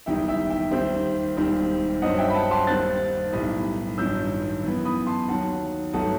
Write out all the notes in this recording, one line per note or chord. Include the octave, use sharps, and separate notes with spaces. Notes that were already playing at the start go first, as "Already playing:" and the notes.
F#1 E2 D#3 G3 D#4 E5 G5
E5 G5
E5 G5
D#2 D#3 G3 C5 E5
E1 D#2 D#3 G3 C4
G2 F#3 C4 D#5 F#5
E5 G5
B5
F#5 A5
A5 C6
D#2 D#3 G3 C4 F#6 A6
B1 A2 G3 D#4
A1 G2 D#3 F#3 E6 G6
F#2 E3 B3
B5 D#6
A5 C6
D#2 D#3 F#3 F#5 A5
G1 F#3 A3 D#4 F#5 A5